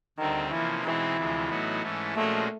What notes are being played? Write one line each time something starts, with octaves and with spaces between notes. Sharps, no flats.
D2 D3 D#3 G3 C4
C3 E3 F3 A#3 C#4
B2 E3 G#3 C4 D#4
D2 C3 F3 G#3
A2 F#3 B3 D#4 F#4
G#2 E3 A3 C#4
A#2 F3 G#3 A3 C#4 F#4